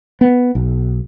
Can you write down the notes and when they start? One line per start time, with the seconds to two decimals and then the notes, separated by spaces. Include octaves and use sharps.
0.21 B3
0.55 B1